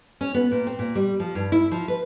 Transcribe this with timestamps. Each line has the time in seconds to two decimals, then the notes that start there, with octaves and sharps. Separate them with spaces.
0.21 C#4
0.35 B3
0.51 A#2
0.67 C4
0.79 A#2
0.95 G3
1.20 F3
1.35 G2
1.52 E4
1.72 F3
1.88 B4